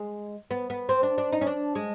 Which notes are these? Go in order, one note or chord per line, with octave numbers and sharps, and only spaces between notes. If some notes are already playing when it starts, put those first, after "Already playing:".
Already playing: G#3
B3
B3
C4
D4
D4
D#4
C#4
D4
G#3